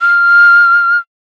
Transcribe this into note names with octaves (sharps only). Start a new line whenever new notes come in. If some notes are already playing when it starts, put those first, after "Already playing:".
F6